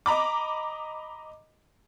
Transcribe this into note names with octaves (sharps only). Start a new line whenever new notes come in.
D#5 A#5 B5 D6